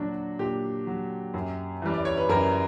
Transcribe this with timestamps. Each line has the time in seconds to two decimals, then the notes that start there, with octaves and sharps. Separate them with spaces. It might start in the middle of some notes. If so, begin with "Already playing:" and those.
Already playing: A#2 F#3 D4 F#4
0.39 A#2 G4
0.87 F#3
1.34 F#2
1.82 E3 G3
1.94 D5
2.05 C#5
2.17 B4
2.29 F#2 A#4